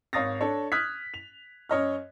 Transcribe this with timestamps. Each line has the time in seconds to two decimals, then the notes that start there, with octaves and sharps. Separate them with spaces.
0.13 G#1 C#5 F5 D#6 A6 A#6
0.41 D4 A4 C#5
0.72 D#6 F6 F#6 G#6 B6
1.14 F7
1.69 F#2 C#5 D#5 F6